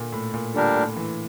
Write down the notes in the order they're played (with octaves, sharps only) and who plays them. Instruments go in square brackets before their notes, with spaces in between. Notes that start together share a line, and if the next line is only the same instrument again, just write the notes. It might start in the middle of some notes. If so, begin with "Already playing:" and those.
Already playing: [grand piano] A#2 D3
A2
A#2
[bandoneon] A#2 G3 D4 G4 A#4 [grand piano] D3
[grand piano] A2
E3